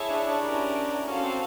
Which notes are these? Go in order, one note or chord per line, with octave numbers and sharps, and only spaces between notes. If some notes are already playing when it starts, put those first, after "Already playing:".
Already playing: E4 G#4 C#5 E5 A5
D4
D4
C#4 E4 G4 A#4
C#4 F#4 A4 C5 F5
C4